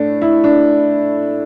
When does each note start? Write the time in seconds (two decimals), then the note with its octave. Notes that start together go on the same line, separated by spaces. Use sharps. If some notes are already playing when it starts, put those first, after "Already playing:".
Already playing: A2 A3 D4
0.21 E4
0.44 D4